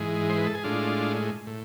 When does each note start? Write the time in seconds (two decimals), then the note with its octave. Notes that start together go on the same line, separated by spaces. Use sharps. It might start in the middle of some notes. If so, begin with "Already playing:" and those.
Already playing: G#2 E3 G#3
0.29 C5
0.38 B4
0.46 A4
0.55 G#4
0.64 A2 G#3 D4 F4
1.47 A2